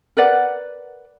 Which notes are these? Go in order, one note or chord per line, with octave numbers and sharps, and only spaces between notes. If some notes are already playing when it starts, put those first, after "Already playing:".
A#4 B4 D5 F#5